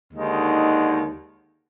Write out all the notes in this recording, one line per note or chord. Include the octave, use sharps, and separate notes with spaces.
D#2 D3 G#3 D#4